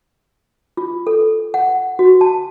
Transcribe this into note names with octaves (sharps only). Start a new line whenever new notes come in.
F4
A4
F#5
F#4
A5